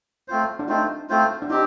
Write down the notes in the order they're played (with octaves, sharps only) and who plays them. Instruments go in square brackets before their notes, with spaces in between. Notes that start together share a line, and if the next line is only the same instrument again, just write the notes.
[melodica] A3 C4 F4 C5
[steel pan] D4
[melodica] A3 C4 F4 C5 [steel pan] D#4
[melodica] A3 C4 F4 C5
[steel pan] D4
[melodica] C4 G4 [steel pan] D#4